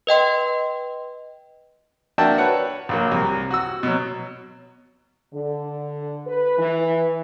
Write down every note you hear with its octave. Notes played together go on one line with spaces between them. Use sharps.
B4 D#5 G5 C6
A#3 D4 F#4 E5 G5 A5
B4 C#5 F#5
A#1 F#3 A#3
C2
F#4 E6
B2 F#3
D3
B4
E3